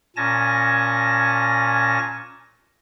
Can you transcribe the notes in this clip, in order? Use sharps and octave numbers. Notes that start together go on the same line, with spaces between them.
A#2 C#4 G#5 A5 A#6